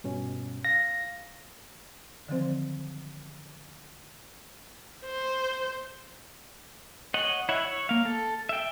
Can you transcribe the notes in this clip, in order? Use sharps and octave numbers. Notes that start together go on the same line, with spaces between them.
G2 B2 C#4
F5 A#6
D3 D#3 F3 F#3 C4 C5
C5
C#5 D#5 F#5
E4 C#5 E5 F#5
C#5
A#3 F5
A4
E5 G5